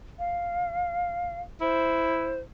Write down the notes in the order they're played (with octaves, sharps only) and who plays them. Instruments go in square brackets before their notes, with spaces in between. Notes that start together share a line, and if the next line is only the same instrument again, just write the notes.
[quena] F5
[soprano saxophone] E4 [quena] C5